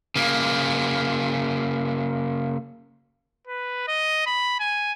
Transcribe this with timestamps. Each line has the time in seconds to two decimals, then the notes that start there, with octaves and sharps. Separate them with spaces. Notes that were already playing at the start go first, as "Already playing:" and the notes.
0.16 C#3 A#3
3.47 B4
3.88 D#5
4.26 B5
4.60 G#5